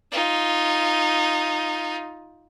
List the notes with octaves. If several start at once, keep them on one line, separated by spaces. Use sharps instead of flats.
D#4 F4